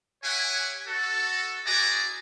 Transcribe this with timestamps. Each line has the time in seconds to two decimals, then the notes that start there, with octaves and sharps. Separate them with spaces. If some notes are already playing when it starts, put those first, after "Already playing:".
0.23 G4 C#5 E5 F#5 G#5
0.86 F#4 A4
1.65 E4 F#4 G#4 D5 G#5 A#5